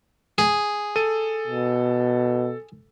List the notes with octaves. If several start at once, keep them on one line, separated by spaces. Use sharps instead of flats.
G#4
A4 D#7
B2